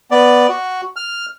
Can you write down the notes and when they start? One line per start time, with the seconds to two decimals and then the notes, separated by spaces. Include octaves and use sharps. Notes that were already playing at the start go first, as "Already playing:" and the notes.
0.11 B3 D5
0.49 F#4
0.96 F6